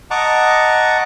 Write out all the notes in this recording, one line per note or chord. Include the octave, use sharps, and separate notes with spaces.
D#5 F#5 A5 A#5 C#6 D6